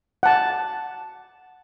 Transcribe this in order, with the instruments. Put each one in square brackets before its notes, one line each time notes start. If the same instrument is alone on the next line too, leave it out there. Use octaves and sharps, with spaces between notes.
[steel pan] F#5 A5